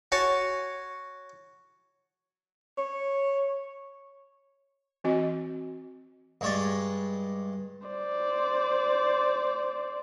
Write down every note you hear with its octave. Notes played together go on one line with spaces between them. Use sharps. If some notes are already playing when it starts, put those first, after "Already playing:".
F#4 C#5 G#5 A5
C#5
E3 C4 F#4 D#5
G2 G#3 C#5 D5
C5 D5